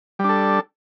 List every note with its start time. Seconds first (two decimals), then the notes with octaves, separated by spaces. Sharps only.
0.19 G3
0.24 D4
0.29 A4